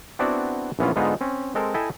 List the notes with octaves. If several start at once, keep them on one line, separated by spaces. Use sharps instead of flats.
B3 C4 D4 E4 F#4 D5
A#1 E3 B3 C#4 F4
G#2 D3 G#3 B3 D#4 F4
C4 C#4
G#3 C4 A4 A#4
E4 A4 D#5 E5 G5 G#5